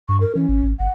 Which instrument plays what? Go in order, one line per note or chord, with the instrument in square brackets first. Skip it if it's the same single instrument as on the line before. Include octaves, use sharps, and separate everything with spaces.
[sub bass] G2 [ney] C#6
[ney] A#4
[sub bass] E3 [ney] C#4
[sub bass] G#1
G#1
[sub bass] G1 [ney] F#5